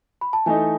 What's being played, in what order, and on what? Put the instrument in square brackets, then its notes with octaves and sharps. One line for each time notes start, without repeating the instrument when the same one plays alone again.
[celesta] B5
A5
[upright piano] E3 A3 D#4 A4 [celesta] G#5